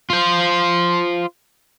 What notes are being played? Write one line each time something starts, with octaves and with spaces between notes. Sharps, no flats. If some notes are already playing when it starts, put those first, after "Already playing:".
F4 C5